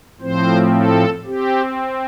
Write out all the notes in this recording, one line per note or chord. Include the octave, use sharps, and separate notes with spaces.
A2 F3 C4 C5
A4
C4 G4